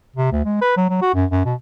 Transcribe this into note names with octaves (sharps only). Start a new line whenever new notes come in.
C3
D2
G#3
B4
F#3
F#3
F#4
F#2
F#2
B2